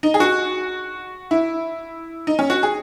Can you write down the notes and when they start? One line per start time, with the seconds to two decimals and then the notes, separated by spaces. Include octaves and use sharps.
0.03 D#4
0.14 G#4
0.20 F#4
1.31 E4
2.27 D#4
2.39 C#4
2.50 F#4
2.63 G#4